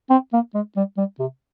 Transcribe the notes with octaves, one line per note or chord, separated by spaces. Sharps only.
C4
A#3
G#3
G3
G3
C3